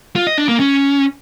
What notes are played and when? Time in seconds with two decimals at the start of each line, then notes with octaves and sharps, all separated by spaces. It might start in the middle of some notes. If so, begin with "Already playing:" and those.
0.16 F4
0.27 D#5
0.38 D4
0.49 A#3
0.60 C#4